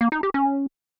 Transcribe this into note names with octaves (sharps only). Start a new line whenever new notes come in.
A#3
D#4
G4
C#4